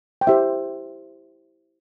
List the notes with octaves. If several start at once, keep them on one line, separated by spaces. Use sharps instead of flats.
G5
E4 G4 C5 E5